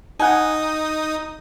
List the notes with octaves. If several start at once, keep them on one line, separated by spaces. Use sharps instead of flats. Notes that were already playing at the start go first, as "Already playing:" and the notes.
D#4 F#5 G#5 D#6